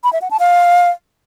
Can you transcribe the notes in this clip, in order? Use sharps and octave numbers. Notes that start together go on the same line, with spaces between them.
B5
E5
F#5
A5
F5